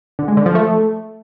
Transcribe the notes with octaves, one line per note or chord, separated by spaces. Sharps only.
D3
G#3
D3
F3
A3